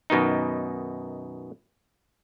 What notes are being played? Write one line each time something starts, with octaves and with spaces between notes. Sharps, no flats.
F#2 B2 D#3 D#4